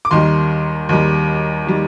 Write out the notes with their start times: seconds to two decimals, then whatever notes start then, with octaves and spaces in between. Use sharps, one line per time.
0.05 D6
0.11 D#2 D#3 G3 C6
0.89 D#2 D#3 G3
1.67 D#3 G3